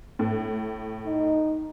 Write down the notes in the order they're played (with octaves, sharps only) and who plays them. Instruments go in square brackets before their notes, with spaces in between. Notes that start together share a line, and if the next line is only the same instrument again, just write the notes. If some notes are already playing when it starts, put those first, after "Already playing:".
[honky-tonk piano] A2
[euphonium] D#4